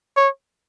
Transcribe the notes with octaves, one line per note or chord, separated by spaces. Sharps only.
C#5